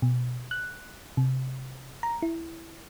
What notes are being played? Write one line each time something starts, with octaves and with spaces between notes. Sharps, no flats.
B2
F#6
C3
A#5
E4